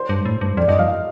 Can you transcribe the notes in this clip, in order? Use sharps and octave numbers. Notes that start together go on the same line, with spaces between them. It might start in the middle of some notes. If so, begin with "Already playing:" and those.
Already playing: C5
G2
A2
G2
F2 D5
G2 D#5
F2 F5
D#5